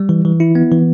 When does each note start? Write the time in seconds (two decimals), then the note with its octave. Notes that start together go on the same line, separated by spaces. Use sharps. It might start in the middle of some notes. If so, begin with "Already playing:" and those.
Already playing: G3
0.09 E3
0.25 E3
0.40 E4
0.55 B3
0.71 E3